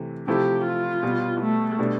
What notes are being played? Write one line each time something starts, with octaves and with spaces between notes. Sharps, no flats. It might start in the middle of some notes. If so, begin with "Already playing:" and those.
Already playing: C3 E3 A3
C3 F3 A3 E4 G4 A4
F4
B2 G3 B3
A3
B2 G3 D4 A4